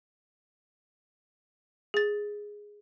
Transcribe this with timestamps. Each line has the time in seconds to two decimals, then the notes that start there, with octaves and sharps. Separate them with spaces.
1.94 G#4 A6